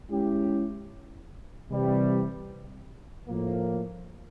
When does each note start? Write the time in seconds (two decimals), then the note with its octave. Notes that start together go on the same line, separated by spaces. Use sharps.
0.10 G#3 C#4 E4 G4
1.69 C3 E3 G3
3.27 A2 F3 A#3